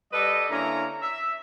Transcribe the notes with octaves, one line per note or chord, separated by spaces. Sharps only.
G3 A4 B4 D#5
D3 A#3 C#4 E4 E5 A#5
E5